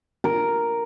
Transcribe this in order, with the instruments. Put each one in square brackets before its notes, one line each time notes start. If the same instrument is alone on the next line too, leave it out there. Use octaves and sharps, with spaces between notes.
[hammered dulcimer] A#4